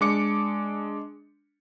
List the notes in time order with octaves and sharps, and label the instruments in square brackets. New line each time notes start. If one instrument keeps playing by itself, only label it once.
[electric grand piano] G#3 D4 D6 C#7